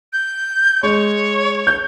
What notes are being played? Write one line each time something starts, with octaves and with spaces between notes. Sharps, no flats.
G6
G#3 C#5
G6